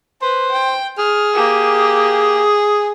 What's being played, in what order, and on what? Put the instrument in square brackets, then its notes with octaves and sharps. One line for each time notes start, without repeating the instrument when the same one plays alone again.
[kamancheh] B4 [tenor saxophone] C5
[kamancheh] G5
[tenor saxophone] G#4 [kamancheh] F6
[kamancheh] A#3 G4